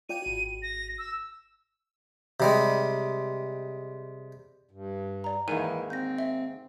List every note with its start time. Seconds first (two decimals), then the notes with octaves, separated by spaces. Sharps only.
0.09 F4 D5 G5 D#7
0.22 G#1 F#4
0.63 A#6
0.98 E6
2.40 C3 G3 G#3
4.71 G2
5.24 D5 A#5
5.48 D#2 G#2 E3 E4 A#4 D#7
5.90 C4 G6 A#6
6.18 E5